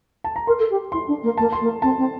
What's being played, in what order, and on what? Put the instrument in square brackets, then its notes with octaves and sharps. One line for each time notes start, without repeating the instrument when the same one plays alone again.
[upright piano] A5
A#5
[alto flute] A#4 [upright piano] C6
[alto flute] A4
G4
[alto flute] E4 [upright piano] C6
[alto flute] D4
A#3
[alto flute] A#3 [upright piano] A5
[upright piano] C6
[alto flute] A#3
[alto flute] C4 [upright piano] A5
[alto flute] C4